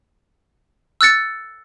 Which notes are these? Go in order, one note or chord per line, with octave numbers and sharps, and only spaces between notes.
E6 F#6 A6 C#7